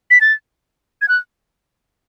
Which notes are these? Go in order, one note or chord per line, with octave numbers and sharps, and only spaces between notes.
B6
A6
G#6
F#6